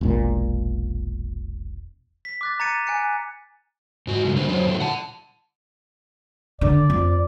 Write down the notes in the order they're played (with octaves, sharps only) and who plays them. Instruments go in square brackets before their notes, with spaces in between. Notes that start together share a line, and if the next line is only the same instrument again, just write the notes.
[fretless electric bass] E1 A#1 A#2
[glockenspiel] B6
D6 F#6 A6
A#5 G#6 A6 C#7 D#7
G#5 F#6 C#7
[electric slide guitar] G#2 F#4
G2 C#3 G#3
D3 G3 A#3 D4 A#4 C5
F2 F#3 C5 C#5
A#2 D3 E3 F#3 A3
F#5 A5
[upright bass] D3 [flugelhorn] D5
[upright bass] F2